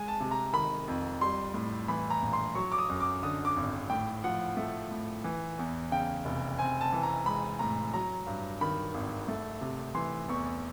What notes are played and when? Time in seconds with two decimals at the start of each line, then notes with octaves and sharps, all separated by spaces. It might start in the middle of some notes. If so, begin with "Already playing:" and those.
Already playing: G#3 G#5
0.08 A5
0.20 C3
0.31 A#5
0.53 D#3 B5
0.88 F2
1.21 G3 C6
1.54 A2
1.88 E3 B5
2.10 A#5
2.22 A#1
2.33 C6
2.55 F#3 C#6
2.72 D6
2.78 D#6
2.89 F#2
3.00 D6
3.23 D3 D#6
3.45 D6
3.56 G#1
3.90 A2 G5
4.24 F3 F#5
4.57 A3
4.91 A2
5.24 E3
5.59 E2
5.91 C#3 G5
6.25 F1
6.59 C4 G#5
6.81 A5
6.93 E3
7.03 A#5
7.26 G#3 B5
7.59 A2 A#5
7.94 F#3 A#5
8.26 G2
8.61 D#3 B5
8.94 G#1
9.28 A3
9.61 C3
9.95 E3 C6
10.29 E2 C#6